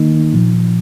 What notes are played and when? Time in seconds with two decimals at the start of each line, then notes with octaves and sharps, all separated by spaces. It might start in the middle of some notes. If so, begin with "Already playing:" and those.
Already playing: D#3 A#3 D#4
0.33 A#2 F3